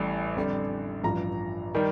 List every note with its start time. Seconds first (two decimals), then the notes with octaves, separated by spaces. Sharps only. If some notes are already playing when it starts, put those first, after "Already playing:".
Already playing: A1 A2 G3
0.36 F2 D3 G3
1.04 A1 G2 F3 A#5
1.75 D#3 G3